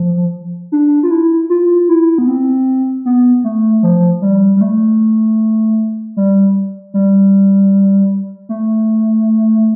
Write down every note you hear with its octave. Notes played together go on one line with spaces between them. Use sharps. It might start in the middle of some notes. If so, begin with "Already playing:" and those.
Already playing: F3
D4
F4
E4
F4
E4
B3
C4
B3
A3
F3
G3
G3
A3
G3
G3
A3